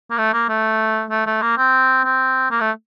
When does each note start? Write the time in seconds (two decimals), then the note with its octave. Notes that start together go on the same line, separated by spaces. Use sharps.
0.11 A#3
0.18 A3
0.33 A#3
0.49 A3
1.11 A3
1.26 A3
1.42 A#3
1.58 C4
2.04 C4
2.51 A#3
2.60 A3